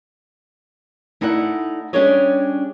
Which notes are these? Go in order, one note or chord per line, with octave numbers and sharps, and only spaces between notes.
A3 D#4 E4 D5 F#5
G3 C#4 D4 G#4 C#5 D#5